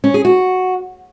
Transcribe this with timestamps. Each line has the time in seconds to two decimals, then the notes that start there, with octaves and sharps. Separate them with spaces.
0.04 C#4
0.14 G#4
0.25 F#4